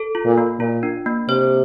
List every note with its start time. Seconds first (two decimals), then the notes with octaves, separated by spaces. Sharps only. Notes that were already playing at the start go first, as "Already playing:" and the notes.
Already playing: A4
0.15 F4
0.26 A#2
0.38 A#3
0.60 A#2 F4
0.83 D4
1.06 A#3
1.29 C3 C5